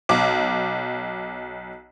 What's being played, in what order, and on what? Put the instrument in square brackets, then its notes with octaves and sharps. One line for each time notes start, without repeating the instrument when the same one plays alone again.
[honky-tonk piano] B1 D6